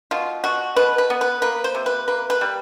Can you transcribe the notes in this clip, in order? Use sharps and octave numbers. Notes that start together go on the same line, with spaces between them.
B2 F4
B2 F#4
B2 B4
B4
B3
B4
A#3 B4
C5
C3
B4
A#3 B4
B4
G3